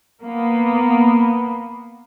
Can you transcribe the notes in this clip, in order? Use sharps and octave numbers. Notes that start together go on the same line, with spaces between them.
A#3 B3